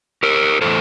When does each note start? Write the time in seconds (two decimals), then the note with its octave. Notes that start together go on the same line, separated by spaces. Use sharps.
0.23 G4 A#4
0.61 A2 E3 A3 A4 C5